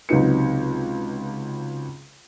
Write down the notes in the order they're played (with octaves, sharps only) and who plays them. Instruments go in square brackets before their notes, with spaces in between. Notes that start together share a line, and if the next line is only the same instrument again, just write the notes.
[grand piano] C#2 C3 F#3 D#4 B4 C#7